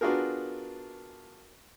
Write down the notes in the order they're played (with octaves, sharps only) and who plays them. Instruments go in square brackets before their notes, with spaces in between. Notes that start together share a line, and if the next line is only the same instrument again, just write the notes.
[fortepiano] B3 D4 F4 F#4 G#4 A#4